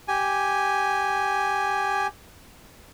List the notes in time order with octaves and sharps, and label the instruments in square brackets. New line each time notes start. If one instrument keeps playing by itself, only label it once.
[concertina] G4 G#5